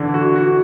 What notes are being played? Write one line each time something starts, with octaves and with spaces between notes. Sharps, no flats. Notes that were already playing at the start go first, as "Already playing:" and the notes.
Already playing: D3 E3
F#4
F#4